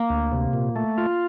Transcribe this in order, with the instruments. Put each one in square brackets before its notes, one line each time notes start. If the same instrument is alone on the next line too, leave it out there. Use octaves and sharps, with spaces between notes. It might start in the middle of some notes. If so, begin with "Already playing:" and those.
Already playing: [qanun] A#3
[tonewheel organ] D2
C3
A#2
A3
F4